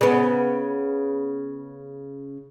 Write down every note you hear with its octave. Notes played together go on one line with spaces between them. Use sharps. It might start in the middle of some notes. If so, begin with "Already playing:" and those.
C#3 B3